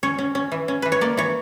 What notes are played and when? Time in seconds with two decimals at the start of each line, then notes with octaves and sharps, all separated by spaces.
0.03 C#4 C#5
0.18 C#4
0.35 C#4
0.52 E3
0.68 C#4
0.82 E3 B4
0.92 C#5
1.01 A#3 D5
1.17 E3 C#5